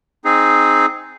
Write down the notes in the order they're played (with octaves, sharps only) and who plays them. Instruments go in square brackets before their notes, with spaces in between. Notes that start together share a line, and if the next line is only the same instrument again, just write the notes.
[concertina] C4 D#4 G#4